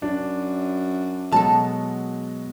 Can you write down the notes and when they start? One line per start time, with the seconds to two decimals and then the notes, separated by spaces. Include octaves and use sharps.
0.02 F#2 D4
1.32 B2 F#3 G#3 A4 A5